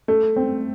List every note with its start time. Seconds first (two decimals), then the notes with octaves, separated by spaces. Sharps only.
0.08 A3
0.36 C4